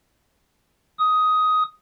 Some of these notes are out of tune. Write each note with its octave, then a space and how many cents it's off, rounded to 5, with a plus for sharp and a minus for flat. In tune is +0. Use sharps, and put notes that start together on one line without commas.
D#6 +10